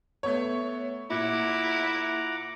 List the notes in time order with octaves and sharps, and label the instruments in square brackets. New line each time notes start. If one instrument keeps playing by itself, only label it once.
[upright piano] A3 B3 C#5
[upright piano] A#2 [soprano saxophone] E4 [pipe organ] F#5 A#5 D6